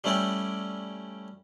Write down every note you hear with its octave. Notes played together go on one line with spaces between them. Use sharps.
G3 A3 C#4 E4 D5 G5